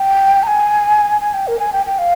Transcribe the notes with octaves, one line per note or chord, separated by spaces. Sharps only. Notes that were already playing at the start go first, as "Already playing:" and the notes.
Already playing: G5
A#5
G#5
G#5
G5
A#4
G#5
G5
G5
F5